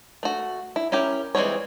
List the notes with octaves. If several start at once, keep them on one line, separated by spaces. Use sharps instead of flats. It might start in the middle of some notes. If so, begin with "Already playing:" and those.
A3 F#4
E4
C#4 E4 G4 A#4
E3 G3 G#3 C4 C#5